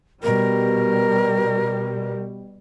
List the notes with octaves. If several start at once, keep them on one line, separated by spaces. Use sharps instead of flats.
B2 G3 A#4